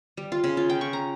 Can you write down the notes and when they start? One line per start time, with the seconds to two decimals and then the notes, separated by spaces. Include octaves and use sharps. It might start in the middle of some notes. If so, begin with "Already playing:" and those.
0.17 G3
0.32 F4
0.44 C#3
0.57 F4
0.70 G5
0.81 C#6
0.93 A#5